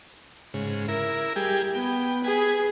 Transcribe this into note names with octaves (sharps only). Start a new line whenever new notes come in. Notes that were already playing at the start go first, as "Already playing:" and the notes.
G#2 C#3
E4 A#4
G3 G4 G#4
B3 G5
G#4 B4 G#5